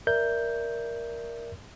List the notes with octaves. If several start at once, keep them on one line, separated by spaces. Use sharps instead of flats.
A#4 D5 E5 G6